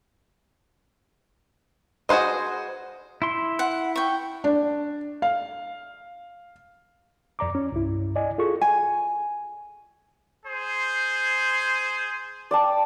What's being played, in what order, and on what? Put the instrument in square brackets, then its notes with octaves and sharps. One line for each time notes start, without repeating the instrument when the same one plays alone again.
[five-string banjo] F#4 G#4 B4 C5 D#5
[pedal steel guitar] E4 C6
[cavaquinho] F#5
G5 C#6
[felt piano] D4
F5
[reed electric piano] F2 D5 A#5 D6
C#4
C2 G2 E4
D5 D#5 G#5
F4 G#4 A4 C#6
[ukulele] G#5
[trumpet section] G#4 C5
[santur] D5 G5 A5